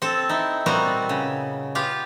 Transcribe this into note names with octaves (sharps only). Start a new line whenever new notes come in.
C4 A4
D#4 E4
A#2 G3 B3 C4 F#4 A#5
C#3
B3 F4 G4 F5